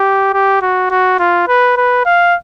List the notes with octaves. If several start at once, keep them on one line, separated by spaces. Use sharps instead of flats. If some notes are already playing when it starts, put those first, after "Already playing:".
Already playing: G4
G4
F#4
F#4
F4
B4
B4
F5